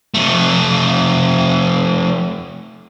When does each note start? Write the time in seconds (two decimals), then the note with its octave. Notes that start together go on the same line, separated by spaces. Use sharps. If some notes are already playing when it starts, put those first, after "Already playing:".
0.14 F3 A3